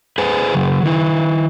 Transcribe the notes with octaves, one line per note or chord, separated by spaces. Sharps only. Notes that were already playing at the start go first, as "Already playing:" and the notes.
G#4 B4 C5 G#5
C#3 F#3
D#3 E4